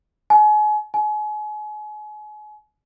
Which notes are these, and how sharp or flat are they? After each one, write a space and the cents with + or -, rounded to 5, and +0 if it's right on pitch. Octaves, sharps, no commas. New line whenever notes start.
G#5 +35
G#5 +35